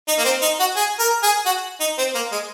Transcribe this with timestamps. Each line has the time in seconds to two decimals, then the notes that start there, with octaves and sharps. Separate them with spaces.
0.08 D#4
0.19 A#3
0.25 C4
0.42 D#4
0.60 F#4
0.76 G#4
0.99 A#4
1.23 G#4
1.46 F#4
1.80 D#4
1.98 C4
2.15 A#3
2.32 G#3